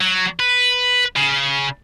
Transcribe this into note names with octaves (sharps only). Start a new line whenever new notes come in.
F#3
B4
C#3